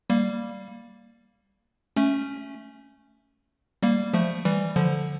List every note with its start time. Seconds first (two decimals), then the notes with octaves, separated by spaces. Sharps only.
0.10 G3 A#3
1.96 A3 C#4
3.83 G3 A#3
4.14 F3 A3
4.45 E3 G3
4.76 D3 F3